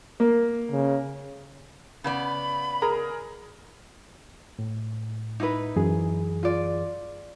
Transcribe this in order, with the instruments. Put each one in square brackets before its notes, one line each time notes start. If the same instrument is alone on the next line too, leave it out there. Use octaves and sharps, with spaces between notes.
[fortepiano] A#3
[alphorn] C#3
[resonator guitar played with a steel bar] C#3 B3 D5 [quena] B5
[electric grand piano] G#4 A#4 A#5
[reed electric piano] A2
[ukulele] D#4 E4 B4
[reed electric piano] F#2 E3 G#4
[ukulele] F4 D5